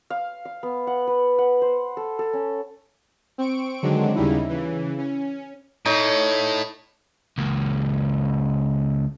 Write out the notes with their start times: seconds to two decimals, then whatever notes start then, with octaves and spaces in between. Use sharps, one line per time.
0.10 F5
0.45 F5
0.63 B3
0.87 F#5
1.07 B4
1.38 F#5
1.62 C5
1.97 A4
2.19 A4
2.33 C#4
3.38 C4 C#6 D7
3.82 D3 D#3 F#3 G#3 C4 D4
4.15 D#2 C#3 G3 D#4 E4
4.49 C#3 E3
4.98 C#4
5.86 A2 D#4 C#5
7.38 C#2 A#3